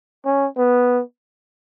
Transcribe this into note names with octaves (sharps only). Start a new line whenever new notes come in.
C#4
B3